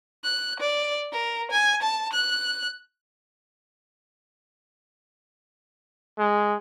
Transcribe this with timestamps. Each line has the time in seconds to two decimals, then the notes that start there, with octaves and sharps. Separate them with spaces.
0.24 F#6
0.60 D5
1.12 A#4
1.51 G#5
1.82 A5
2.13 F#6
6.19 G#3